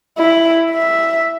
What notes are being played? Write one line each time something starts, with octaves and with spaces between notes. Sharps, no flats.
E4
E5